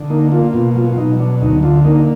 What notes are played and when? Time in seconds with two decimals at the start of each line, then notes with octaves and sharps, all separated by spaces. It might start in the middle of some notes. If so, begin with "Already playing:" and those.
Already playing: D3
0.10 A#3 D#4
0.32 A#3 F4
0.53 B2 F4
0.75 F#3 F4
0.92 F4
0.97 B2 D#4
1.19 F#3 D4
1.41 D2 D#4
1.63 D3 F4
1.85 A#3 D#4